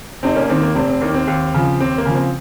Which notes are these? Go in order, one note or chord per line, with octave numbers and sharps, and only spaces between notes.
F1 C4 D#4
A#3 C#4
D#2 D#3 C4
A#3
F1 C4
C4
D#2 D#3 A#3
C4
D#2
C#3 F3
D#2 C4
A#3
C#3 F3
C4